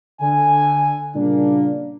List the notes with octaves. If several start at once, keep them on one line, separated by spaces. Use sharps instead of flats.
D3 G#5
A#2 C#3 G3 A#3 D4